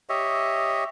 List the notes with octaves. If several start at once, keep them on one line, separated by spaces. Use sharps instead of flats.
G4 C#5 D#5 E5